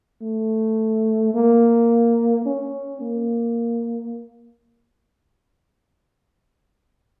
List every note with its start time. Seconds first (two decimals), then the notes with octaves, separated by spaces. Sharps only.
0.22 A3
1.34 A#3
2.46 C#4
3.01 A#3